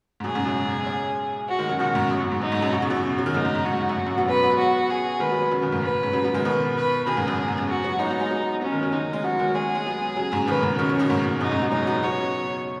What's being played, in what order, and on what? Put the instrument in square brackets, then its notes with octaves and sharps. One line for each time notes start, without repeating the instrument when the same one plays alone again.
[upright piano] G#2
[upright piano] F#2 B2 [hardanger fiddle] G#4
[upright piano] G#2 C#3
F#2 B2
G#3 C#4
[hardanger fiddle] F#4
[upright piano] D#3 G#3
C#3 F#3
[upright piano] B2 D#3 [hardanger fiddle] F#4
[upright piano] G#2 C#3
F#2 B2
F#2
G#2
[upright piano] F#2 [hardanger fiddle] D#4
[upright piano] G#2
F#2 B2
[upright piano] B2 [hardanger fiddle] F#4
[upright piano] C#3
F#2 B2
F#3
D#3
[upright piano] G#2 C#3 [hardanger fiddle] D#4
[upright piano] G#2
G#2
[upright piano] G#2 [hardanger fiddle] F#4
[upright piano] G#2
F#2
G#2
F#2 B2
F#3 B3
[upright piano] G#3 C#4 [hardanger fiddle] B4
[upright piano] F#3 B3
[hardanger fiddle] F#4
G#4
[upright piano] D#3 G#3 [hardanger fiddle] B4
[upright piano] F#3 B3
F#3 B3
C#3 F#3
B2 D#3
G#2
[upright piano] G#2 [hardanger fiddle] B4
[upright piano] G#2 C#3
C#3 F#3
F#3 B3
D#3 G#3
[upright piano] B2 D#3 [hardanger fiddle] B4
[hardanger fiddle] B4
[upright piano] B2 D#3 [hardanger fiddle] G#4
[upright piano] G#2 C#3
F#2 B2
F#2
G#2
F#2
[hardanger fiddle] F#4
[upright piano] F#3 B3
[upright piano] G#3 C#4 [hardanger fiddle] D#4
[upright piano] F#3 B3
G#3 C#4
F#3 B3
[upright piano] F#3 B3 [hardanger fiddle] C#4
[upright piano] D#3 G#3
C#3 F#3
[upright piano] D#3 G#3 [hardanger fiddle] D#4
[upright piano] G#3 C#4
[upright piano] F#3 B3 [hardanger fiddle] F#4
[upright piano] D#3 G#3
[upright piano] G#3 C#4 [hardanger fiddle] G#4
[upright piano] G#3
F#3 B3
C#3 F#3
G#2 C#3
[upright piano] B2 D#3 [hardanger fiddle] B4
[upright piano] G#2 C#3
[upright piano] B2 D#3 [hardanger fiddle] C#4
[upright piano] C#3 F#3
B2 D#3
G#2
G#2
[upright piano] F#2 B2 [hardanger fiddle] D#4
[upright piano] G#2 C#3
F#3 B3
[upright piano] G#3 C#4 [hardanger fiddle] D#4
[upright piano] F#3 B3
[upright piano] F#3 B3 [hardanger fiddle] C#5
[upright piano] C#3 F#3